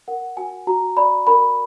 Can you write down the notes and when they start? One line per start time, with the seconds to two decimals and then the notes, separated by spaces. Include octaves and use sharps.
0.08 A#4 F#5
0.37 F#4 G#5
0.67 F#4 A#5
0.97 D5 B5
1.27 A#4 B5